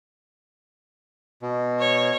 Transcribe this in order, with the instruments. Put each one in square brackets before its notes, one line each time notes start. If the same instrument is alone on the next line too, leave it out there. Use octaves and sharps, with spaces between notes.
[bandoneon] B2
[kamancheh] C#5